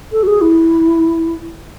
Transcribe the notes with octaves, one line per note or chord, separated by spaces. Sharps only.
A4
F#4
G#4
E4